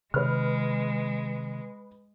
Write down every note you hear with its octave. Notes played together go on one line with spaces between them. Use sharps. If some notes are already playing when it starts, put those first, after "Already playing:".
C3 D#3 G#3 B4 F6